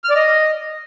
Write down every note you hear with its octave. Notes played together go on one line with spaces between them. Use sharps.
F6
D5
D#5